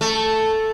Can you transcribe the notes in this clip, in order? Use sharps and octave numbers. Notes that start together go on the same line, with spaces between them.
A3